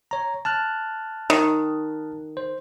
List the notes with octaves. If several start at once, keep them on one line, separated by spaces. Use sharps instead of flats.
C#5 A#5
A5 F6 F#6
D#3
C5